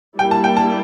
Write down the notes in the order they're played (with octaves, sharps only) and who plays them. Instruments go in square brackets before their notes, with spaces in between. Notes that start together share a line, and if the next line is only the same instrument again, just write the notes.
[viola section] G3 A#3 E4 [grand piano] G5
[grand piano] A5
G5
A5